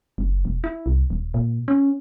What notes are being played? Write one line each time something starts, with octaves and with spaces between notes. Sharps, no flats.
F#1
E1
E4
C2
D#1
A#2
C#4